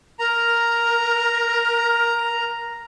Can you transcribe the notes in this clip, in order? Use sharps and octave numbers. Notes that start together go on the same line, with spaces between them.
A#4 A#5